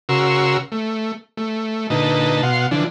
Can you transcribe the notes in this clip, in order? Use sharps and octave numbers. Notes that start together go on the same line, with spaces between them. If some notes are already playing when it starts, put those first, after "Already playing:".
C#3 F#4 A#4 C6 C#6 E6
A3
A3
A#2 D3 D#4 B4 A5
B2 F5 F#5 C6
D3 E3 F3 D4